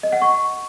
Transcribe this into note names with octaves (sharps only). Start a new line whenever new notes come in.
D#5
F#5
C#6